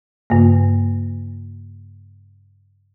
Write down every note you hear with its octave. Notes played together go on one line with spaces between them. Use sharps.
G2 C#3 A#3